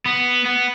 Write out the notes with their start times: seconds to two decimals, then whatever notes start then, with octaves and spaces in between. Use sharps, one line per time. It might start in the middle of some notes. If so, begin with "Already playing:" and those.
0.06 B3
0.45 B3